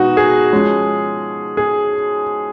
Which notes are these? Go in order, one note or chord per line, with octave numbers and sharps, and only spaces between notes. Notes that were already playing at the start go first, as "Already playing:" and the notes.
Already playing: B2 G#3 B3 D#4 F#4
G#4
F3 G#3 C#4
G#4